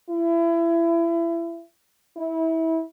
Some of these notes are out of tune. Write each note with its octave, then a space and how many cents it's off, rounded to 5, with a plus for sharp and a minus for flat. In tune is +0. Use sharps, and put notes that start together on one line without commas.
E4 +30
E4 -25